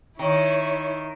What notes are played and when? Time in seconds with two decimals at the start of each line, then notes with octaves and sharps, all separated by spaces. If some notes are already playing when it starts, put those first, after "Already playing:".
0.19 D#3 E4 C#5